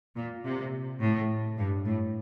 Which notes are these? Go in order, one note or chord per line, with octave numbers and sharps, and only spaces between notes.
A#2
C3
A2
G2
A2